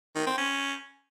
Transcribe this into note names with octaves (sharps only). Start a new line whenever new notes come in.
D#3
C4
C#4